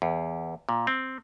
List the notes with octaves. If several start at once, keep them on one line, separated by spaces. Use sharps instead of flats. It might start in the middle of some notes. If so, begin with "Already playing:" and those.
E2
A#2
C4